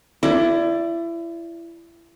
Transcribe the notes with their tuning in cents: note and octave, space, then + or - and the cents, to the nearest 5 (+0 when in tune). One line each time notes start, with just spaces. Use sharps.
E4 +30 D5 +0